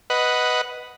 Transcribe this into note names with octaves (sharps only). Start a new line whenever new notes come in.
B4 D#5 F#5